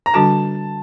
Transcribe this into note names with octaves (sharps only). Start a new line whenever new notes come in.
A#5
D3 G3 D4 F#4 A4 A5